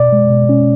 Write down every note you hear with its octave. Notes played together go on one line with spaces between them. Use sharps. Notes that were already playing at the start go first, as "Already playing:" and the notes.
Already playing: B2 D5
G#3
B2
C#4